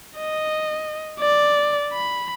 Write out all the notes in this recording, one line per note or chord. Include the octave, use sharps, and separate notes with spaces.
D#5
D5
B5